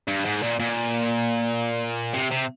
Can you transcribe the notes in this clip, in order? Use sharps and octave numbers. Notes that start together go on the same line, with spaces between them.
G2
G#2
A#2
A#2
C3
C3